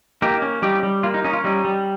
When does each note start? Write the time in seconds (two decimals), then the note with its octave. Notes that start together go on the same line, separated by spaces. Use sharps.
0.22 A#3 D#4 G4
0.42 C#4
0.62 G3 D#4 G4
0.83 G3
1.03 A#3 F4
1.14 D#4
1.24 C#4 D#4
1.33 F4
1.44 G3 D#4
1.65 G3